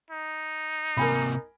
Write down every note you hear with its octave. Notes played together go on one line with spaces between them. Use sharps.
D#4
C3 A#3 A#4 G#5 B5